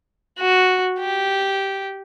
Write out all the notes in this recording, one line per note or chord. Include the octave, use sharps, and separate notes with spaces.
F#4
G4